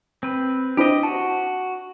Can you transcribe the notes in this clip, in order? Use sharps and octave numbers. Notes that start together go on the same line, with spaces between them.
C4 B4
D4 E4 G4 C5 D#5
F#4 A5